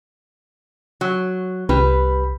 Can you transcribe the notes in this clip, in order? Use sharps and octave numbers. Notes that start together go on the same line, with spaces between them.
F#3
C2 G3 B4